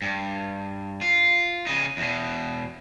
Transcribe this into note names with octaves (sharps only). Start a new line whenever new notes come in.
G2
F4
C#3 D#4
E2 B2